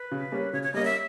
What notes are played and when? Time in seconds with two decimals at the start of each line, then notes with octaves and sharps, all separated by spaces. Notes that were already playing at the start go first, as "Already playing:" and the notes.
Already playing: B4
0.11 C#3
0.32 G3 A#3 C#4
0.53 C#3 C#5
0.63 C#5
0.74 G3 A#3 C#4 D#5
0.85 E5